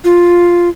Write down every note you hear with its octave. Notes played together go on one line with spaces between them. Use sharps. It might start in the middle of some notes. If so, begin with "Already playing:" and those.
F4